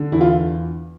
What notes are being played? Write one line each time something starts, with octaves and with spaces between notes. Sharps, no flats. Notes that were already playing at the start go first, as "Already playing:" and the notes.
Already playing: D3
E2 E4
F4